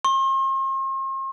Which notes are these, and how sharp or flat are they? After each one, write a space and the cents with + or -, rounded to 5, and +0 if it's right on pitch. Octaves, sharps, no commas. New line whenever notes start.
C6 +45